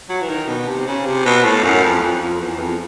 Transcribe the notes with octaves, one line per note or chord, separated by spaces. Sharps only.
F#3
E3
D#3
B2
C3
C#3
C3
B2
A2
F#2
F2
F2
F2
E2
F2